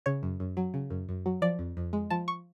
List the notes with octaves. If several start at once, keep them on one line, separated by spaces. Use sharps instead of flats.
C#3 C#5
F#2
F#2
F#3
C#3
F#2
F#2
F#3
F3 D5
F2
F2
G#3
F3 A5
C#6